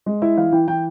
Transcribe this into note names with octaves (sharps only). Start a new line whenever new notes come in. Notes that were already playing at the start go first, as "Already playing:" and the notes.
G#3
E4 E5
E3 F5
E3 G5
E3 G5